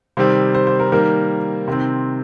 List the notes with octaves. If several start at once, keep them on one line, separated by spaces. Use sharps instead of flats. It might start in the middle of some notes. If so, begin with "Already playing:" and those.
C3 D#3 G3 C4 C5
C5
C5
A#4
D#3 G3 A#3 A#4
C3 D#3 C4